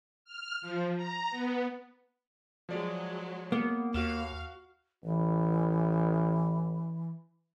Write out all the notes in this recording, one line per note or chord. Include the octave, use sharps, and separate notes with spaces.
F6
F3
A#5
B3
F3 F#3 G#3 D5
A#3 B3
D#2 F#4 F5 F6 E7
A1 E3